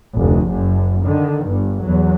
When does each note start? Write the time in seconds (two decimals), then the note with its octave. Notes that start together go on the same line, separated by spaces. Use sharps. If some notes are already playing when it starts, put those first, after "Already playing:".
0.15 F1 D2
0.49 F#1 F#2
1.04 D3 D#3
1.46 G1 G2
1.82 E2 F#3